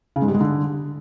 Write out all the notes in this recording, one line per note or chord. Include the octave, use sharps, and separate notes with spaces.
C#3
G#2
G3
G#3
D3